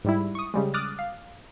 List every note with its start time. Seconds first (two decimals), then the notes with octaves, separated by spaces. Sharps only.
0.04 G#2 G3 E4
0.35 C#6 D#6
0.54 C#3 G3 G#3
0.74 D6 D#6 F6 F#6 A6
0.99 F5